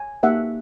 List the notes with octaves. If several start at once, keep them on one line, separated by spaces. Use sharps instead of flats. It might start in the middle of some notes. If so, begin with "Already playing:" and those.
Already playing: G#5
A#3 D#4 G4 E5 F#5